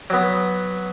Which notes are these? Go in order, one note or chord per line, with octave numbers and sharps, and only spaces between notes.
F#3 B3